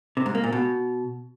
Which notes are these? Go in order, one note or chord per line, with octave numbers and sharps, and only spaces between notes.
C3
G#2
A#3
A#2
B2